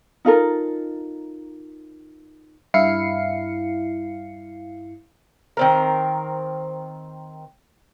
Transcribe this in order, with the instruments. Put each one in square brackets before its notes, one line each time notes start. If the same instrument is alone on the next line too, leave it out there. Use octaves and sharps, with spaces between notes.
[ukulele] D#4 F4 A4 A#4
[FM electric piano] G2 E4 F5 C7 C#7
[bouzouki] D#3 C4 A#4